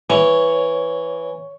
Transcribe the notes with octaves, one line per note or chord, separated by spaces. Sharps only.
E3 C#5